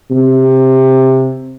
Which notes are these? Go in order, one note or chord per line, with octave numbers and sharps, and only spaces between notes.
C3